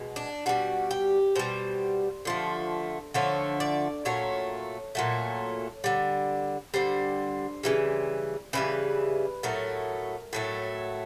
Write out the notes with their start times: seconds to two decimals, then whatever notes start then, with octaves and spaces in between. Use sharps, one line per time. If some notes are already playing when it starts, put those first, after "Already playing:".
Already playing: B2 G#3
0.16 D4
0.46 B2 G3 F#4
0.91 G4
1.36 B2 G3 C5
2.25 D3 F3 A3
3.14 D3 F3 A3 C#5
3.60 D5
4.05 A#2 F#3 A3 C#5
4.95 A#2 F#3 A3
5.84 D3 G3
6.74 D3 G3 C5
7.63 C#3 E3 G3
8.53 C#3 E3 G3 B4
9.43 A2 F#3 A3 A#4
10.33 A2 F#3 A3